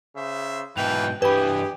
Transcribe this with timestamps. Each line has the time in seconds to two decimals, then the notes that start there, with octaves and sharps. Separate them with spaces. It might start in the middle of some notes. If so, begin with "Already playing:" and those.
0.16 C#3 C5 E5
0.77 G#2 B2 E3 A#3 B4 G5 F7
1.22 G2 E3 G4 G#4 B4 B5